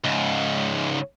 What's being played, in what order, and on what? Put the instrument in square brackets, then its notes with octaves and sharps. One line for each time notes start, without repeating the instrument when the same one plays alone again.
[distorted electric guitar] C#2 G#2